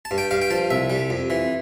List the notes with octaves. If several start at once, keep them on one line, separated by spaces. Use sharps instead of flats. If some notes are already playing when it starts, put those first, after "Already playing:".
A5
G2
G5
G2 F5
G5
F3 A5
C2 E5
G3
F2
E3